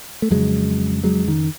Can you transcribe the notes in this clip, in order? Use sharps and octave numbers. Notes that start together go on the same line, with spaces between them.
A3
F2 C#3 F#3 G#3
F#3 G#3
D#3